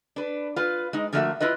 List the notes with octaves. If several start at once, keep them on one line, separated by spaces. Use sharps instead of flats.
D4 B4
F4 B4
G#3 D#4
D3 F3 A3 A#3 F#4 E5
E4 F4 B4 D#5